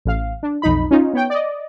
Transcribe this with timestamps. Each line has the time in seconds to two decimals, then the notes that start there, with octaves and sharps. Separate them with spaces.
0.05 A1 F5
0.43 D4
0.62 B1 F2 D#4 B5
0.91 C#4 D#4 F4
1.14 B3 C#5 G5
1.30 D5 D#5